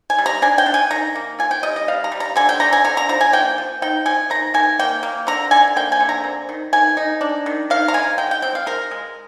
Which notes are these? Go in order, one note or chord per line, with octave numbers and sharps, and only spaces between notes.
G#5
G3
A#5
D4 G#5
G5
D4
G#5
D#3 A#5
A#3
F4 G#5
G5
G3 D#5
D#5
G3 F5
A#5
G3
A#5
D3 G#5
G5
D3 A#5
G#5
D3 A#5
A#5
F3 A#5
G#5
A#3 G5
F3
D#4 G5
F3 G#5
D#3 A#5
D#3 G#5
A#3 G5
A#3
D3 A#5
D3 G#5
A#3 G5
G#5
D3
A#5
C4
D#3
D#3 G#5
D#4
D4
D#3
D#3 F5
A#5
G#3 G#5
G#3 G5
G5
C4 G5
F5
G#3 A#4
G#3